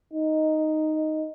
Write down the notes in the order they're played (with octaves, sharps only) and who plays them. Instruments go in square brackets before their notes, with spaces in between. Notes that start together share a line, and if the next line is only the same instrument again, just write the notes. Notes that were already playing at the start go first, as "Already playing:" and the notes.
[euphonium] D#4